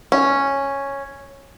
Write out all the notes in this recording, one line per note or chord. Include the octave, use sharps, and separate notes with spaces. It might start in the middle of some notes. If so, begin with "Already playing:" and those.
C#4